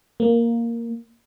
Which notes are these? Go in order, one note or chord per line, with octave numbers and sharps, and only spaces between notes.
A#3